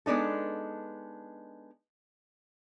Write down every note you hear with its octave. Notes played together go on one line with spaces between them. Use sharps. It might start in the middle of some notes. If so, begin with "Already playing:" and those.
G#3 B3 D4 D#4 A4